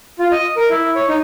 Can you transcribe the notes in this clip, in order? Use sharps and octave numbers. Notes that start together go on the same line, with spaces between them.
F4
D#5
A#4
E4
C#5
D#4